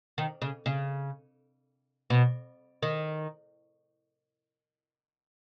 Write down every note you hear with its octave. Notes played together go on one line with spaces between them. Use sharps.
D#3
C#3
C#3
B2
D#3